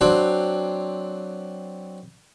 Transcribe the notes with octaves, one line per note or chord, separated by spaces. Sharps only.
F#3 C4 D4